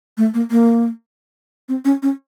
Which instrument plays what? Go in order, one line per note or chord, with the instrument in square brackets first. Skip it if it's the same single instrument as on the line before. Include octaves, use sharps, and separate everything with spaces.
[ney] A3
A#3
A#3
C4
C#4
C#4